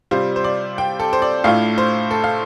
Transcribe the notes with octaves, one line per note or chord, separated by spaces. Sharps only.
C3 G3 F4 C5
C5
D5
G5
A4
C5
D5
A2 A3 D4 F4 F5
C5
A4
F5